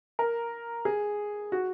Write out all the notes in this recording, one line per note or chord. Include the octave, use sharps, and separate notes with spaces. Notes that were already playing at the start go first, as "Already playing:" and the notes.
A#4
G#4
F#4